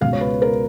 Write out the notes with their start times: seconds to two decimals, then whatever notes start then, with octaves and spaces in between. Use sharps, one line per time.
0.01 C#2 B2 G#3 F5
0.13 C#5
0.21 B4
0.42 A#4